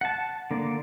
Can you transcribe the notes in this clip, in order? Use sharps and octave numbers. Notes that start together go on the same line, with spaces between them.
F#5 A5
D3 A#3 D5